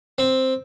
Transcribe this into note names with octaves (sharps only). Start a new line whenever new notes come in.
C4